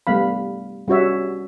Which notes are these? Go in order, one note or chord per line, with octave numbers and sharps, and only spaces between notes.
G3 A3 B3 F5 B5
G3 C#4 F#4 C#5 E5